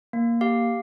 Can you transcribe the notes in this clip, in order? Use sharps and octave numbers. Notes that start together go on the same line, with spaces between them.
A#3
G4 F5